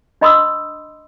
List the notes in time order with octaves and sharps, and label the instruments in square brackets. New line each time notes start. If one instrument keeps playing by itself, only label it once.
[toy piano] D4 D#5 B5 C6 D#6 E6